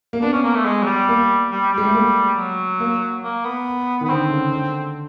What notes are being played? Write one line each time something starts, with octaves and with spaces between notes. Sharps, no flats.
A#3
B3 D4
C#4
A#3
A3
G#3
F#3
G3
A#3
G3
G3
G#3
A3
A#3
F#3
A#3
A#3
B3
D#3
B3
D3 C4
C#3
D3